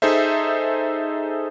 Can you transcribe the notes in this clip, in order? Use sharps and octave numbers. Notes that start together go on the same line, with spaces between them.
D#4 G#4 A4 C5 E5